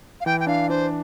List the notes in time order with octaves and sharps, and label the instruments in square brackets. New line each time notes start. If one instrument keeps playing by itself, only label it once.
[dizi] F5
[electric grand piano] E3 [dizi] G5
[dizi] G5
[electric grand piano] D4 [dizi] F5
[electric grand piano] D4 [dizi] C5